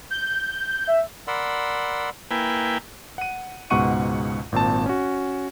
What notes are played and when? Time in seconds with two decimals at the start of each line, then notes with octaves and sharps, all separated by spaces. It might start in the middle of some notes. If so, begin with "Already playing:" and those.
0.10 G6
0.87 E5
1.27 A#4 D5 F#5 B5 C6 E6
2.31 A#3 E4 B4 G5 G#5
3.18 F#5 D#7
3.70 C#2 G#2 B2 F#5 C#6 D#7
4.52 G#1 A#2 C4 A5
4.86 C#4 F#4